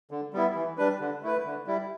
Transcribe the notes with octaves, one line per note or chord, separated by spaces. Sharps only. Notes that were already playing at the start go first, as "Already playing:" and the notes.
D3
G3 B3 E4
E3
G3 D4 B4
D3
A3 E4 B4
D3
G3 E4